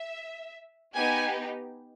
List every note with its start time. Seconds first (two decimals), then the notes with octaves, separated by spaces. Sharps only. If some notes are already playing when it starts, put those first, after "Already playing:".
Already playing: E5
0.95 B3 D#4 G4 G#5